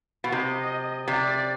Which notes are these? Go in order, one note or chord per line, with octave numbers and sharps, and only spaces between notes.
B2
C3 D#5
C3 D5